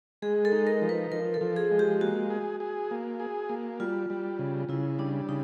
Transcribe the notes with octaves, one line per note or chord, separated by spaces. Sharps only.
G#3 G#4
A4
D#4
A#4
F3
B4
F3 A#4
A4
F3
G#4
G#3
G4
A#3 F#4
G#4
G#4
A#3
G#4
A#3
G3 F4
G3
C#3
C#3 E4
G3 D4
C#3 D#4